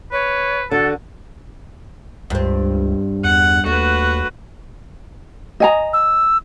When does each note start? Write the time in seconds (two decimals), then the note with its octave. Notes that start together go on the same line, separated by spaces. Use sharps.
0.12 B4 C#5
0.71 D3 F#4 A4
2.30 C#2 G2 C4
3.24 E2 F#5
3.66 D#2 A3 F#4 B4
5.60 D#5 G#5 A#5
5.93 E6